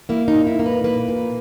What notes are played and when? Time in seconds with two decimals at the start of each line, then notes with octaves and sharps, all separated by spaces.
0.09 A#3 E4
0.28 D#4
0.35 A#2
0.47 E4
0.59 A#3
0.66 B4
0.84 A#3 B4
1.08 A#2